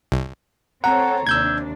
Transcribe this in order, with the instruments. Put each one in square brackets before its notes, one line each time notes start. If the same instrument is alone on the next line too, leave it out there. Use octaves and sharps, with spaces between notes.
[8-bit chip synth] C2
[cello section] C4 A4 C#5 [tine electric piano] F#5 [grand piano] A#5
[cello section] D#2 C3 D4 [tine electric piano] E6 G6 G#6